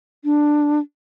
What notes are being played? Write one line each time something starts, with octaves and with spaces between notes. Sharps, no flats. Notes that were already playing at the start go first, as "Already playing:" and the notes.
D4